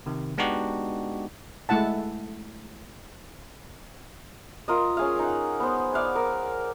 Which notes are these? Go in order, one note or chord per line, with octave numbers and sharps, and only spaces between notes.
C3 D#3
G#3 B3 D4 D#4 F#4 G4
G#3 A3 E4 F#5 A5
F4 A#4 D#5
C#4 G#4 F5
D#4 F#5
B3 C5
D5 F5 F#5 G#5
A#4